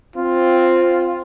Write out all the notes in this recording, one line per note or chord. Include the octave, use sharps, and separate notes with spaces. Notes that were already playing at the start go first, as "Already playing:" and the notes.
C4 F4